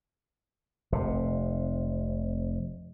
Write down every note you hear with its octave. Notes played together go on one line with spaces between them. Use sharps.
F1 C3